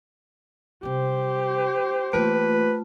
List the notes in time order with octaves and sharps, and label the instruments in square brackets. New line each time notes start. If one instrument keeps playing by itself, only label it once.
[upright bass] C3 G3 [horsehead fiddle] G4 C5
[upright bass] E3 A#3 [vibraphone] A3 F4 [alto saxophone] B4